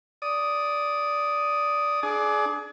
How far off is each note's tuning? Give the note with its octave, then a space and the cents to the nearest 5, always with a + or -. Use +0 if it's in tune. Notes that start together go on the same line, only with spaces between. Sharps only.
D5 -10 D#6 +0
D4 +0 G#4 +30